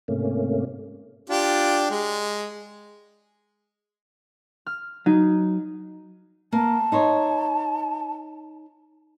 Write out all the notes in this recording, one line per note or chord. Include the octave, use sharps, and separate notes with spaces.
G#2 C3 A3 A#3 C#4
D4 F4 G4
G#3
F6
F#3 D#4
A#3 A5
D#4 C5 C#5